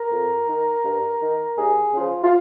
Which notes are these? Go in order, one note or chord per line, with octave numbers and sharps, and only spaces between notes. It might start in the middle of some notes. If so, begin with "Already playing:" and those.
Already playing: A#4
F2
D#3
G2
D#3
D#2 G#4
C#3 F3 F4
F4